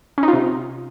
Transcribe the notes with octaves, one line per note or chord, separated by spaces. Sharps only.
C#4
D#4
F4
C3